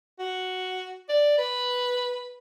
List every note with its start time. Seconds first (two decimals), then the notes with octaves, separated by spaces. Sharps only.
0.19 F#4
1.09 D5
1.38 B4